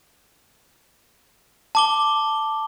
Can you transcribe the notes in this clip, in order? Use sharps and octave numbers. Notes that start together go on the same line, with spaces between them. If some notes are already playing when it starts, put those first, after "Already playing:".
A5 D6 G7